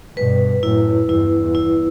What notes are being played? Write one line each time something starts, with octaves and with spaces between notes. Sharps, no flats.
G2 B2 B4
F#2 A2 E4
E2 G2 E4
E2
E4